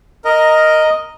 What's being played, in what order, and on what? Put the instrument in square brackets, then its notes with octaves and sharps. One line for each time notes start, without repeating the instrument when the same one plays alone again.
[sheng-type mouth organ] A#4 [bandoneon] D#5